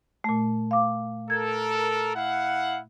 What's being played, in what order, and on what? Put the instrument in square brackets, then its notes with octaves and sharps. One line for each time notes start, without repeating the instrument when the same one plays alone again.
[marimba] A#2 A3
F5 D6
[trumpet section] A4 A#4 [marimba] G#6
[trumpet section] E4 F5 F#5